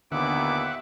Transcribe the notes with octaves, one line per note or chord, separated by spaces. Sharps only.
D#2 A#2 D3 B3 E5 F#5 D6